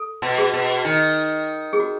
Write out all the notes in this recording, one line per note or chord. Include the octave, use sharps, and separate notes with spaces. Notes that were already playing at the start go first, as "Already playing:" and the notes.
Already playing: A4
B2
G#4
B2
D#3
G#4
F#4